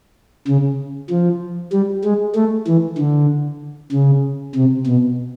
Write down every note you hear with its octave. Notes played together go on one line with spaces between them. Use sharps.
C#3
F3
G3
G#3
A3
E3
D3
C#3
C3
B2